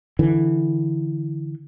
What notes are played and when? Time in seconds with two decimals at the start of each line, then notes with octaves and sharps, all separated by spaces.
0.19 D3 E3